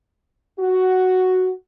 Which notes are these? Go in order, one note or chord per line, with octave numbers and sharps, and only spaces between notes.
F#4